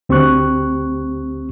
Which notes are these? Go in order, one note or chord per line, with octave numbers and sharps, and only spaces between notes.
D2 C4 G4 C#6 F#6